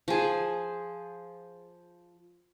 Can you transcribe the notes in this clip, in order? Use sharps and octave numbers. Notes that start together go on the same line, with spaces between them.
F3 G#4